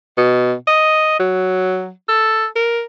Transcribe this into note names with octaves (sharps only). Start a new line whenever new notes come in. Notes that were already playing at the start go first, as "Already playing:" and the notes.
B2
D#5
F#3
A4
A#4